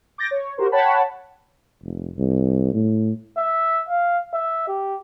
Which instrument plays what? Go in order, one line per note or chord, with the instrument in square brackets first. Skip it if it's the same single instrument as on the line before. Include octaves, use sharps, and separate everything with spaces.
[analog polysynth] D6 G6 A6 A#6
C#5
F#4 G4 A#4 C5
C#5 F#5 G5 A5 B5
[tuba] F1
C2
A2
[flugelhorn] E5
F5
E5
G4